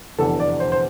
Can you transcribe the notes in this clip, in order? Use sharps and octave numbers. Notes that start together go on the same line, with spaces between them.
F1 E2 D3 A4
D5
C5
C5